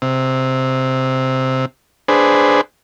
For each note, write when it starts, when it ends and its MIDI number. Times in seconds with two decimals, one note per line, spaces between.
0.02 1.65 48
2.08 2.61 62
2.08 2.61 68
2.08 2.61 71
2.08 2.61 72